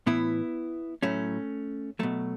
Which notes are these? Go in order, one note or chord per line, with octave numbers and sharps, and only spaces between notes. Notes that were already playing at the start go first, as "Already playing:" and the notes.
A2 E3 B3 E4
A2 F#3 A3 C#4
B2 F#3 A3